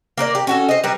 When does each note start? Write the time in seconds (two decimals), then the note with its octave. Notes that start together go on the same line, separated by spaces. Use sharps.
0.18 A#3 A#4 B4 D5
0.35 G4
0.47 C#4 F#4 A4
0.69 C5 D#5
0.84 G3 A#4 B4